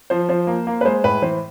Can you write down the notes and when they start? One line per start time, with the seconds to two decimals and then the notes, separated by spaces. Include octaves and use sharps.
0.10 F3 C5
0.29 F3 C5
0.47 A#3
0.67 A#3
0.81 B4
0.85 G#3 C5
1.04 A2 B4
1.22 E3 C5